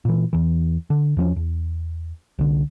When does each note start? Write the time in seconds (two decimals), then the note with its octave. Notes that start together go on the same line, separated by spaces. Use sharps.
0.05 A#2 E3
0.33 E2 E3
0.90 D3
1.17 E2 F3 B3 C#4
1.36 E2
2.39 C2 D3